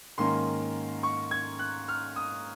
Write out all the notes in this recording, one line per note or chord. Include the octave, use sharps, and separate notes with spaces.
G#2 D#3 A#3 C#4 C6
C#6
G#6
F#6
F6
D#6